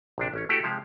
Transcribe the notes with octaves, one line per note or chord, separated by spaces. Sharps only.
A#1 C3 D4
A1 C#4 C#5
A3 E4 F#4 G4 A4
C3 F3 G#3 G4 F5